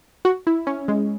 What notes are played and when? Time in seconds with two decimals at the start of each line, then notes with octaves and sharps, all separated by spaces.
0.25 F#4
0.47 E4
0.67 C#4
0.88 G#3